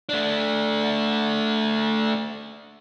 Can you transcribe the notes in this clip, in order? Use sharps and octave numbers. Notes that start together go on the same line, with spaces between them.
A3 D4